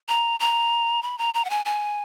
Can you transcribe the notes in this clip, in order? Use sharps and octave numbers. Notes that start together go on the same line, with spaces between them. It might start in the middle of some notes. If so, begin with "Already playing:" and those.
A#5
A#5
B5
A#5
A#5
F#5
G#5
G#5